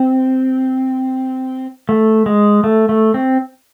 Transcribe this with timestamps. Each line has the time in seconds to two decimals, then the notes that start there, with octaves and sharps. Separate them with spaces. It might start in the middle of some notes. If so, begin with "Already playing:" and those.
Already playing: C4
1.89 A3
2.26 G#3
2.64 A3
2.89 A3
3.14 C4